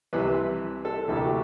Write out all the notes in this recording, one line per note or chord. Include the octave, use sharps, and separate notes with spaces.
C2 C3 E3 B4
A4
D2 C3 E3 A4
G4
F#4